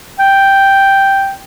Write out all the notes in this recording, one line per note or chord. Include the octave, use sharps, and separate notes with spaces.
G5